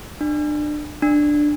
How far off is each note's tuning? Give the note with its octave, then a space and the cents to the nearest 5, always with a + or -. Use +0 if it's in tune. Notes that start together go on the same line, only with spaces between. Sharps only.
D4 +30
D4 +10